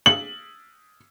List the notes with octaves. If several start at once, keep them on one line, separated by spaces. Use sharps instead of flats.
F#7